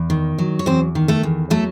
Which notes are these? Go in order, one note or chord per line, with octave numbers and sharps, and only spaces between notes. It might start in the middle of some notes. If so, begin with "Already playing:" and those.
Already playing: E2
D#3
F#3
C#5
E2 C4 C5
D#3
A3 A4
E2
F#3 A3 A4